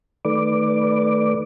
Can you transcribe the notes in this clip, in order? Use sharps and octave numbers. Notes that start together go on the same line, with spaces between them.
D#3 A3 B4 D5 D6